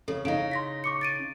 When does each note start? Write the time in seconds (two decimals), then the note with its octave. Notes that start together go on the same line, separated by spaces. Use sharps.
0.08 C#3 A4
0.25 C#3 D#4 F5 D7
0.51 C6 A#6 B6
0.84 C#6 D6 C#7
1.01 A6 D7 D#7